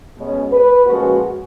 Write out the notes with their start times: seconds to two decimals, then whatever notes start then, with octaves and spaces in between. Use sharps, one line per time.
0.16 B2 G#3 C#4
0.52 B4
0.86 A#2 F3 G#3 C#4 F#4